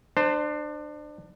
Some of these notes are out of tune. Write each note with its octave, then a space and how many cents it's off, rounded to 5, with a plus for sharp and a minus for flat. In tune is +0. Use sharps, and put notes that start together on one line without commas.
D4 +30 C5 +0